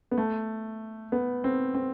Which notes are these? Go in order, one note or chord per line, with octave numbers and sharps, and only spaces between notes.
B3
A3
B3
C4
C4